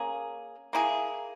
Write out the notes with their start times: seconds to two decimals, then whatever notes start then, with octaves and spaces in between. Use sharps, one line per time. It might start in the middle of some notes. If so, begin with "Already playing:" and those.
Already playing: A#3 C#4 G#4
0.73 A#3 E4 G#4